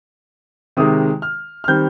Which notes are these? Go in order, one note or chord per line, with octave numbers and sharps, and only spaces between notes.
C3 D#3 G#3 D#6
F6
F6
D#3 G3 C4 G6